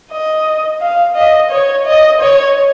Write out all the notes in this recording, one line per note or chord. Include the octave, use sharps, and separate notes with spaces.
D#5
F5
D#5
C#5
D#5
C#5